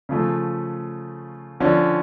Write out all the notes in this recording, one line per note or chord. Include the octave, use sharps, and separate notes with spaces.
C#3 F3 A3
D3 F3 C#4